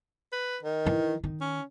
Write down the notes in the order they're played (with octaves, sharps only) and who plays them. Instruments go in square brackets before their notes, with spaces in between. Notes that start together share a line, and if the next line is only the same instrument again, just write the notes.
[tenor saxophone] B4
D#3
[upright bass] E3 D4
D#3 D#4
[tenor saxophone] C#4